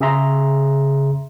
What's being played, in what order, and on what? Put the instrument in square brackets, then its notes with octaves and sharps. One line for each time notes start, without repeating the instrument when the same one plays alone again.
[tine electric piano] C#3 G#4 E5 A#5 C6